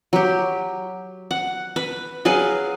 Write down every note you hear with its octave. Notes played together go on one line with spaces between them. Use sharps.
F#3 G4
F#5
B4
F#3 G#4 B4 F5